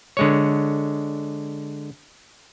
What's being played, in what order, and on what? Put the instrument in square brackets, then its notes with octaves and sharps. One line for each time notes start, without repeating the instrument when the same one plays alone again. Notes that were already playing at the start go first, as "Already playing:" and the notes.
[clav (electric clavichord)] D3 G#3 C#5